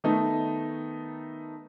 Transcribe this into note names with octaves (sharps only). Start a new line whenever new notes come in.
D#3 A3 B3 D#4